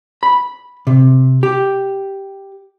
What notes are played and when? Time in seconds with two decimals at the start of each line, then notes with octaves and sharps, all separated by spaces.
0.23 B5
0.87 C3
1.43 G4